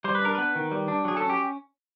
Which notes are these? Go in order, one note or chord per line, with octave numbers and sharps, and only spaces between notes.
G3 C5
B4
D4 A#4
B3 B4
D#3
G3
D4
F#3 G#4
C#4 A4
G4